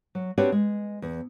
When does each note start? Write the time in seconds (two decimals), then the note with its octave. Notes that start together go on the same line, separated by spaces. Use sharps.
0.15 F#3
0.38 C4 D4 F#4 G4 B4 C#5
0.52 G#3
1.02 E2